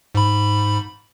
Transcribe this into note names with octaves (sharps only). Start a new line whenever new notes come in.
G#2 B5